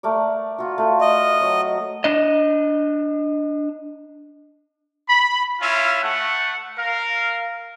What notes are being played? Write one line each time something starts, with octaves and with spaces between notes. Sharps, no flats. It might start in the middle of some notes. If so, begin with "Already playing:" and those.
A3 A#4 D5
F4 F#4
A3 A#4
D#5
F#3
D4 D#5
B5
C#4 E4 F4 E5
A3 F#5
A#4 F5